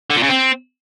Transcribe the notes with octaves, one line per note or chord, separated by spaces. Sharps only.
D3
A#2
C#3
C4